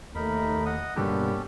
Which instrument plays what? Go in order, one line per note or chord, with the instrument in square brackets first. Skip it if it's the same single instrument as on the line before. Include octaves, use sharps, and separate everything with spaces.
[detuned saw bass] D#2 [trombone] A3 [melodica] D#4 A#4 B5
[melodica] D#5 F#5 D#6
[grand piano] G2 D3 G3 [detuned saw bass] B2 [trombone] A#3 [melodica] C#4 G4 A4